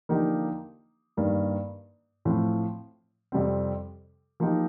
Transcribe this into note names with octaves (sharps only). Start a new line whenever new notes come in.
D3 F3 A#3 D#4 G4
G2 D#3 A#3
A2 F3 C4
F2 C3 G3 C4
F3 A#3 D#4 G4 A#4